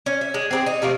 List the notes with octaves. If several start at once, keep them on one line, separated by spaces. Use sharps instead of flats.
C#4
E5
G#3
C4 D4 G#4
D#4
C3 F3 A3 A#3